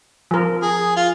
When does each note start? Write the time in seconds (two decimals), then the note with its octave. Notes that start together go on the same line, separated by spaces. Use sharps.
0.31 F3 A#4
0.63 G#4
0.97 F4